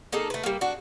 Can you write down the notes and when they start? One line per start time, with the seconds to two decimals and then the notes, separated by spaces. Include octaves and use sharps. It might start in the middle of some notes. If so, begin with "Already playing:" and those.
0.12 A#3 D#4 G#4 A4
0.30 A3 B4
0.43 G3 A#3
0.61 D4 F#4